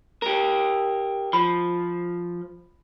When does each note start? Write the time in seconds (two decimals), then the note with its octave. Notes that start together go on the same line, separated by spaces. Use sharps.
0.22 G4 A#4
1.33 F3 B5